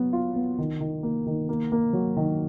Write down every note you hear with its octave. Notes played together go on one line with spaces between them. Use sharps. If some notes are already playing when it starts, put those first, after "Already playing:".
Already playing: F#3 B3
F4
B3
D#3
D#3
A#3
D#3
A#3
A#3
F#3
D#3